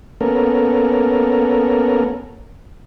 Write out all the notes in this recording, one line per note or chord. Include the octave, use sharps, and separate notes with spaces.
A#3 B3 C#4 A4 A#4